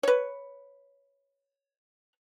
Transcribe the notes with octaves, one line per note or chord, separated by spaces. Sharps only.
B4 C#5